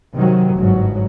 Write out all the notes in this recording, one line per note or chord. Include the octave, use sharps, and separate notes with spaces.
C3 D#3 F#3
G1 G#2 F#3